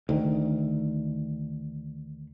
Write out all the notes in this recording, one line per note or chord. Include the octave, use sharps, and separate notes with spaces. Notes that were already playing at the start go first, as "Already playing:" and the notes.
D2 D#3